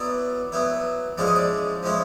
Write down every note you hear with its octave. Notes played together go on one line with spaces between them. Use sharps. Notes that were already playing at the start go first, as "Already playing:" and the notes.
Already playing: F#3 B3 E4 D5
F#3 B3 E4
F3 G#3 C#4 E4 D5
D#5
D5
F3 G#3 C#4 E4